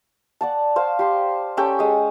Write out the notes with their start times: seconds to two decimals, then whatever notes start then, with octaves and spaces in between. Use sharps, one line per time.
0.41 D5 F#5 A5
0.76 C5 F5
0.99 G4 C6
1.57 C#4 G4 A4 G5
1.79 G#3 D#6